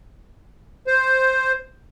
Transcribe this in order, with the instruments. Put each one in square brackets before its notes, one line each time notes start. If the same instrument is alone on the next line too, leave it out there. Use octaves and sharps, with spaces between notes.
[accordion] C5